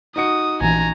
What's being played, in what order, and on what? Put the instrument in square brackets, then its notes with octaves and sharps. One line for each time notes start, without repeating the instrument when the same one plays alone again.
[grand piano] D#4 F#4 C#7 [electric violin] D#6
[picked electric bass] A#1 E3 [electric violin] G#5 A#5